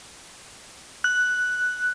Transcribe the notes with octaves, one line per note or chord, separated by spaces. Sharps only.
F#6